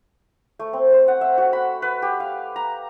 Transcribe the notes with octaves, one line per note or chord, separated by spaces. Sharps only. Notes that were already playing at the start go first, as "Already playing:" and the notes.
A3
C4
C5
F#5
E5
F#4
B5
B4
G4
F5
A#5